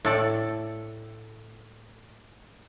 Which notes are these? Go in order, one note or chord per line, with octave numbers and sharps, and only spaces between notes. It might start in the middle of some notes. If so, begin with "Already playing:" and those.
A2 A4 D5